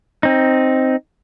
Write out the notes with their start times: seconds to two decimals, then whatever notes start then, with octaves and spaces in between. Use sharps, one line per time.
0.23 C4 D#4